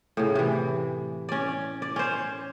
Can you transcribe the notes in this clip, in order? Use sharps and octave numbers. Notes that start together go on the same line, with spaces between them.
A2 C#3
C3 E3
C#4 D5
D5
C#4 C5